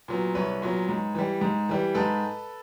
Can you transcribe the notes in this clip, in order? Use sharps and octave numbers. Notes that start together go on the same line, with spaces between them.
A#2 F#3 B3
C2 B4 C#5
A#2 F#3 B3
G#2
E3 G3
G#2
E3 G3
G#2 A4 B4